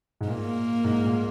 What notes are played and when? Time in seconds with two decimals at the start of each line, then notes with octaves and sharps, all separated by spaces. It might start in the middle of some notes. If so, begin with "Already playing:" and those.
0.21 G#2
0.28 A#2 A#3
0.84 G#2
1.04 A#2